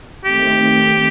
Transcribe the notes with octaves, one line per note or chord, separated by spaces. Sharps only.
D#3 A3 C4 G4